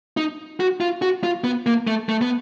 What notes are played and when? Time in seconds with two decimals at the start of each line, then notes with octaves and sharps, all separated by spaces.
0.17 D#4
0.60 F#4
0.81 F4
1.02 F#4
1.23 F4
1.44 B3
1.66 A#3
1.87 A3
2.09 A3
2.21 B3